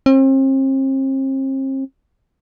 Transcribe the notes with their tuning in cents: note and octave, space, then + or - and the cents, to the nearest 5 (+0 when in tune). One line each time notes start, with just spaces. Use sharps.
C4 +40